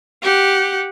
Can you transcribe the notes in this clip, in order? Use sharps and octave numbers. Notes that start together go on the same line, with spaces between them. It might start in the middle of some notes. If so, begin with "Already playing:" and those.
G4 F#5